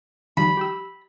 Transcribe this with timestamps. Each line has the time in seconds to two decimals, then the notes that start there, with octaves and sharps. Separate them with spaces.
0.37 D#3 F3 G3 B5
0.57 G4 G5 E6